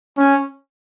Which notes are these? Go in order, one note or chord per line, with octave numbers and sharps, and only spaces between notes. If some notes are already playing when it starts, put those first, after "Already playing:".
C#4